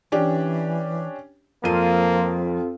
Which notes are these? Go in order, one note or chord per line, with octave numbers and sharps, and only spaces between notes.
E3 C#4 D4 G4
F2 F3 A#3 C4 F4 A4 D#7